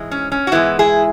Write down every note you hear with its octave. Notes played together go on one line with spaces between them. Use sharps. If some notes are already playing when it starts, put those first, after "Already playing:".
Already playing: G#2 E3 G#3
C#4
C#4
F#4
G#2 E3 G#3 B3 E4
E4 G#4